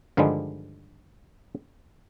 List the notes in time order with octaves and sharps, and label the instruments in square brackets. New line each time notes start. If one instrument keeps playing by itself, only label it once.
[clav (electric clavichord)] G2 D3 D#3 F3 G3 G#3